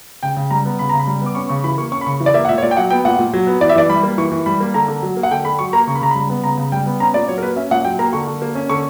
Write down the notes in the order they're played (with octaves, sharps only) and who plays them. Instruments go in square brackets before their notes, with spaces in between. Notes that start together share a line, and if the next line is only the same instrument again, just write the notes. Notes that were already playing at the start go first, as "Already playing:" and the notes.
[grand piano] C#3 G5
C#3
G3 A#5
B3
C#3 B5
C#3 A#5
B5
G3
B3
D6
C#4 C#6
C#3 C#6
E3 B5
A#3 C#6
C#4 C#6
B5
C#3 C#6
E3
D5
A#3 E5
F#5
A#2 E5
C#5
A#2 D5
G5
F#3 F#5
B3 G5
A#2 F#5
A#2
F#3
B3
E3 D5
E5
E3 D5
G3 B5
A#3
E3 C#6
E3
G3 B5
A#3
D3 A#5
D3
F#3
A#3
F#5
D3 G5
D3 B5
F#3 C#6
A#3 A#5
C#3 C#6
B5
C#3 A#5
G3 B5
B3
C#3 A#5
C#3
G3 G5
B3
C#4 A#5
A#2 D5
F#3 C#5
A#4
A#3 B4
C#4 E5
A#2 F#5
F#3 G5
A#3 A#5
D3 C#6
D3
A#3
C#4
D3 C#6